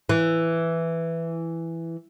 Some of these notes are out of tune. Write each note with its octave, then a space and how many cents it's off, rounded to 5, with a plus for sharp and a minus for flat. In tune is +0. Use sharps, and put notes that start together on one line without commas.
E3 +5